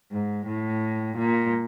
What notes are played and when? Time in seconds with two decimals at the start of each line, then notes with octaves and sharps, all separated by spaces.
0.11 G#2
0.47 A2
1.18 A#2